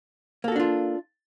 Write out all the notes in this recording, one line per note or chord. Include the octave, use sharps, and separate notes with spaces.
A#3 D4 F4 F#4 A4